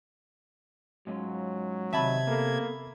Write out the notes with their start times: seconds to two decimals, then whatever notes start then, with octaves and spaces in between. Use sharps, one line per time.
1.07 G#2 F#3 C#4 F4
1.93 C3 D#3 D#5 E5 A5 B5 G#6
2.27 A#3 B3 A4 B4